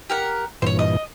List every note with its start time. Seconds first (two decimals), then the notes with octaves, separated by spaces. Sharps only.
0.10 G4 A#4 F#5
0.62 G2 A#2 E3 C5 C#5
0.79 D#5